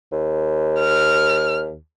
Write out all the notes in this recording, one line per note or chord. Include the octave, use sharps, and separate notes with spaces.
D#2
F6